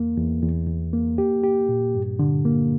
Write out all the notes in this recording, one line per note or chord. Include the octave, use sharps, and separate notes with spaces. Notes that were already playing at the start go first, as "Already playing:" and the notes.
Already playing: E2 A#3
E2
E2
E2
A#3
G4
G4
A#2
G2
D3
A#3